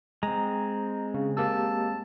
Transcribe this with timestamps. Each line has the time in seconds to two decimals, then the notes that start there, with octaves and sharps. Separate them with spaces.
0.23 G#3 C4 A#5
1.14 C#3
1.37 A#3 G4 A5 E6